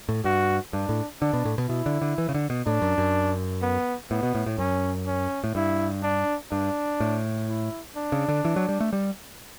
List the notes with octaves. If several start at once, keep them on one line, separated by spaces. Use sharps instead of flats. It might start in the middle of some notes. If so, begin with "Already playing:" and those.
A2
G2 F#4
G2 D4
A2
D3 D4
B2
A2
B2
B2 E4
D3
D3
E3
C#3
D3
B2
A2 D4
F#2
F#2
B3
A2 B3
B2
A2
A2
F#2 C#4
C#4
A2
G2 E4
D4
G2 D4
A2
E4
D4
C#3
D3
E3
F#3
G3
A3
G3